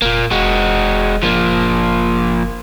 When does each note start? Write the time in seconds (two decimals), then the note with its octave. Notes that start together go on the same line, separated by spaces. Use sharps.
0.02 F1 A#2 A#3
0.31 E1 G#3 F#4
1.23 F#1 F3 A#3